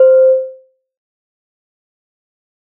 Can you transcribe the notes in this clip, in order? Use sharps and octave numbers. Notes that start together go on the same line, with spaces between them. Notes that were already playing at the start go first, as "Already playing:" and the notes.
Already playing: C5